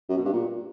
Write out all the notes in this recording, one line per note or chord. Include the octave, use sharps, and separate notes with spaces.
F#2
B2
G2
A#2